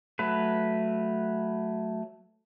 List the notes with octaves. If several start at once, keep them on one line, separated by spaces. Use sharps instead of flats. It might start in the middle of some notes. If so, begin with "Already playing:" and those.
F#3 A3 B4